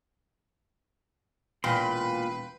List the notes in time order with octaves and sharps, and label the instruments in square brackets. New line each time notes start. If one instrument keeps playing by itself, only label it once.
[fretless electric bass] E1 [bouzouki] A#2 [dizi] B4 [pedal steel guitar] G5 B5 C6